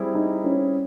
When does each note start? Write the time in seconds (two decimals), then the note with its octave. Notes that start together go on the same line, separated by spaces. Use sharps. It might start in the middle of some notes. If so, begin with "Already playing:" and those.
Already playing: G3 C4 E4 G#4
0.15 D#4
0.44 C#4